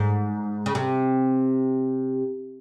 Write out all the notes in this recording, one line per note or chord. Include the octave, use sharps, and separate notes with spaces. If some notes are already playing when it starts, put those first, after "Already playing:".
Already playing: G#2
C#3
C3